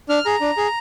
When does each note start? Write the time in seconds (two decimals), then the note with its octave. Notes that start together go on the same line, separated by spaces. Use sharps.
0.09 D4 F6
0.25 G#4 A#5
0.41 D4
0.57 G#4